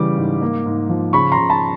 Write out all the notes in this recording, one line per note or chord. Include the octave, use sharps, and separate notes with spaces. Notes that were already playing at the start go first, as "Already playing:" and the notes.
Already playing: C#3 E3 G3 D6
G#2
A#3
G#2
F3
C#3 B5 C#6
A#5 C6
C#3
A5 B5